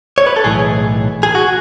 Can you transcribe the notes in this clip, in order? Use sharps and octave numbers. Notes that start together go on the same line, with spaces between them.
C#5
B4
A4
B1 A2 E3 G#4
G#4
F#4